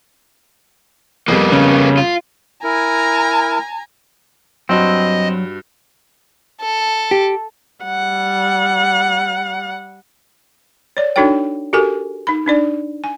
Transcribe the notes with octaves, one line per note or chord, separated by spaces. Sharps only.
F2 G3 A#3 B3
C#3
F4
E4 A#4 G#5 A#5
G2 F#3 C4 F#4 D#5
A4
G4
G3 F#5
C#5 D5
D4 D#4 F#4 A4 C#5 G5
F#4 G4 A4 A#4 G#5
D#4 B5
D4 D#4 D5
G#5